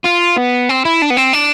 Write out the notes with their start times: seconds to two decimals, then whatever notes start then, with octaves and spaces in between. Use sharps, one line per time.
0.05 F4
0.38 B3
0.69 C4
0.85 E4
1.02 D4
1.10 B3
1.17 C4
1.33 D4